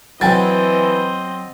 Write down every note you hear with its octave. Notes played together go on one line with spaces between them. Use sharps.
E3 F#3 C4 D#5 G5 A6